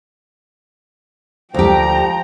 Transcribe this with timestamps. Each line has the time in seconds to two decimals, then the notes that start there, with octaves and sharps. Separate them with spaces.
1.54 D2 F3 G4 G5 A#5